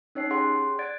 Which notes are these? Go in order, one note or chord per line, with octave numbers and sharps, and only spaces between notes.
C#4 D#4 C#5 G5 C7
G4 G#4 C#5 F#5 G5 C6
D5 F#5 G#6 A6 D7